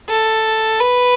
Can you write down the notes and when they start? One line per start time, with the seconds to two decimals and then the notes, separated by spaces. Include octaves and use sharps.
0.09 A4
0.80 B4